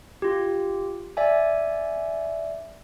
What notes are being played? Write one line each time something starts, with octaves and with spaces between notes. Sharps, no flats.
F4 G4
D5 E5 G#5